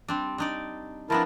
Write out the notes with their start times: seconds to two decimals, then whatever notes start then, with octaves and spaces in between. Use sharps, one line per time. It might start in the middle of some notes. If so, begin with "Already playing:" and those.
0.08 G3 C4 D4
0.38 D4 D#4 D5
1.10 F3 B3 D4 E4 A#4 A5